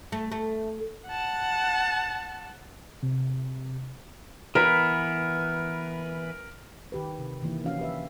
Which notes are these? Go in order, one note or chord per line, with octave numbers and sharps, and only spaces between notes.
A3
A3
F#5 A5
C3
E3 B3 A#4 B4
D#3 G4 B4
C3
D#3 E3 A#3 E4
F3 C#4 D4 F#4 F5
G4 B4 E5